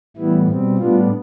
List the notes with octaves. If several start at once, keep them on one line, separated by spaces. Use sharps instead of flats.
A2 E3 G3 B3 E4
B2 G3 C4
A2 G3 B3 D4 F4